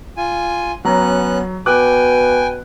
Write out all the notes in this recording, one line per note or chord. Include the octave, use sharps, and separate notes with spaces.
F4 G#5
F#3 B3 C#4 A#5 F#6
B2 G5 G#5 D6 F#6